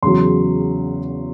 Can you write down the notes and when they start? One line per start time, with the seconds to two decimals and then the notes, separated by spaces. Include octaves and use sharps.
0.02 E2 C#3 F#3 C6